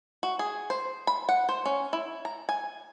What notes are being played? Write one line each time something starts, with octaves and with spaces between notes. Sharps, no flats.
F#4
G#4
C5
B5
F#5
C5
C#4
E4
A#5
G#5